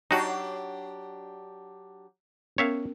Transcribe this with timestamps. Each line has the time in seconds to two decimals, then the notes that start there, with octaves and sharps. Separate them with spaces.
0.11 F#3 D4 D#4 F#4 G4 C#5 A5 C#6
2.58 B3 C#4 A#4 C#5 E5 F5